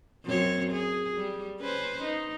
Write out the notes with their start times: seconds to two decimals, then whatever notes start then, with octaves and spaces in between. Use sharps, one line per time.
0.25 F#2 C4 C#5
0.72 G#4
1.17 G3
1.60 C#4 B4 C5
2.03 D#4